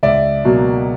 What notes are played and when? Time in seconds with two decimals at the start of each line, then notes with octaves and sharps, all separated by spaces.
0.03 C#2 D5 E5
0.44 B2 F#3 A#3